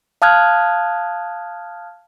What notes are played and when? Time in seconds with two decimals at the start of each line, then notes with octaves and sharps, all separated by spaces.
0.22 F5 A5 D#6 F6 F#6 G#6